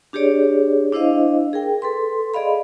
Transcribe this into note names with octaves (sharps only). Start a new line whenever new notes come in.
D4 G4 G#4 C#5 D5
D4 E4 C5 D#5 F5
G#4 A#4 G5
A4 B4 C6
G#4 D5 D#5 F5 B5